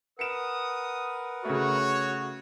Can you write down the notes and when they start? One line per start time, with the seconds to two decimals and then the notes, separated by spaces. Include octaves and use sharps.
0.19 A#4 B4 F#5 D#6 C#7 D7 E7
1.45 C#3 A3 F#4 C#5